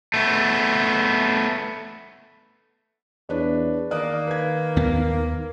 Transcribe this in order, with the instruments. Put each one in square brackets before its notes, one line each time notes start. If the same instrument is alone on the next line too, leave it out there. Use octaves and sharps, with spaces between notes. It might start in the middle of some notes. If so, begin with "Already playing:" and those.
[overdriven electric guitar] A3 B3
[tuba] E2 [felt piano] D4 B4 C#5
[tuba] D#3 [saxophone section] A#3 [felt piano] D5 D#6 F#6
[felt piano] B4 G#6
[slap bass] D#2 B3